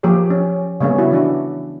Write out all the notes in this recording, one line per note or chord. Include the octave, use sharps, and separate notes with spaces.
F3 A#3 G4 G#4 C#5
C#4
C#3 G3 A#3 B3 C#4 G#4
E4 F#4
E3 D4 F#4